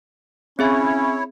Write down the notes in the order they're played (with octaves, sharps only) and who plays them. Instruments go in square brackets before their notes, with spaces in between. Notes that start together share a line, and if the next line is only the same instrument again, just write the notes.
[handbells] C4 G#4 E5 [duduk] C#4 [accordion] E4 C#5